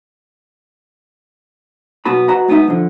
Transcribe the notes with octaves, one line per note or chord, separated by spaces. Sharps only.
B1 B3 F#4 B5
F#4 B4 D#5 F#5 A#5 B5
G#3 B3 D#4 E5
D3 F3